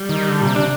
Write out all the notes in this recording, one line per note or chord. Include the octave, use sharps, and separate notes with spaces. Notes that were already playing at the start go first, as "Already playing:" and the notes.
Already playing: G3
D#3
D3
A#2
C3
D4
C3